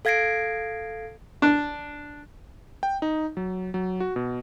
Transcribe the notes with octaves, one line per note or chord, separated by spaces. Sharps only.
A4 F5 G#6 A#6 C7 D7
D4
G5
D#4
F#3
F#3
F#4
B2